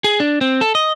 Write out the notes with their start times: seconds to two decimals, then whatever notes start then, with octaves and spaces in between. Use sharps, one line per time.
0.04 G#4
0.20 D4
0.41 C4
0.61 A4
0.75 D#5